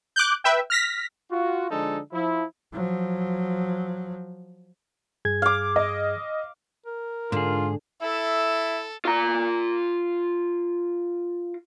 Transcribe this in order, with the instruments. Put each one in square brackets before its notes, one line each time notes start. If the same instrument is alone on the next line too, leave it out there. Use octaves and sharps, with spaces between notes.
[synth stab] D6 F#6 G6
B4 E5 G5
F6 A#6 B6
[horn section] F4 F#4
D3 F3 G#3 D4 D#4 A4
F3 E4
[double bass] F3 F#3
[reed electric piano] G2 G#4 G#6
[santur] F5 D6
[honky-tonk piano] D#5
[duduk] A#4
[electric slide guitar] G#2 G#4 [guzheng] D3 [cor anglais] F4
[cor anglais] E4 [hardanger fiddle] A4 [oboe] E5
[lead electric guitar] F4 A#5